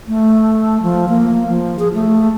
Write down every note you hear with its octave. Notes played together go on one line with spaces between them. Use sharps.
A3
F3
A#3
F3
G#4
A3